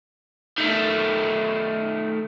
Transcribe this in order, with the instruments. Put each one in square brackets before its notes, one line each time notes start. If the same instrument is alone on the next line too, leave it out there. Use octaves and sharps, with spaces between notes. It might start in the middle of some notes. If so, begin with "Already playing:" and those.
[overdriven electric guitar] D#3 A3